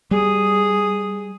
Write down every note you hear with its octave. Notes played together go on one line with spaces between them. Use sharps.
G3 G#4 D#6